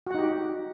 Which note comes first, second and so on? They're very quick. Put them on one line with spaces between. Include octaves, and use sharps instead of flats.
F#4 F#5 D#4 G4